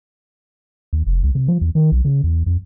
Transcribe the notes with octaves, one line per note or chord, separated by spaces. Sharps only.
D#2
F1
C#2
C3
F3
E2
D#3
B1
C#3
E2
F2